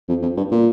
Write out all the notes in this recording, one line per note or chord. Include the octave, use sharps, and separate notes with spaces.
F2
F2
G2
A#2